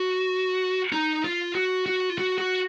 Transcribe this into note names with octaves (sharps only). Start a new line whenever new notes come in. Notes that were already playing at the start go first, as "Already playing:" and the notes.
Already playing: F#4
D#4
F4
F#4
F#4
F4
F#4
F#4